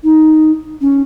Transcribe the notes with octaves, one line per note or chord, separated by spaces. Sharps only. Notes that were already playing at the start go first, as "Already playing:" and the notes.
D#4
C#4